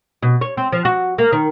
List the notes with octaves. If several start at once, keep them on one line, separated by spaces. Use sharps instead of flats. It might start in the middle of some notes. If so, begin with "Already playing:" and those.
B2
C#5
C4
F3
F#4
A#3
D#3